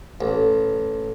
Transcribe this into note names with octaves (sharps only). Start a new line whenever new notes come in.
A1